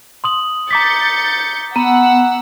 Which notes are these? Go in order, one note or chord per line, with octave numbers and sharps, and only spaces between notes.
C6 D#6 F#7
A#5 D6 G6 A6 B6 C#7
B3 F#5 A#5 E6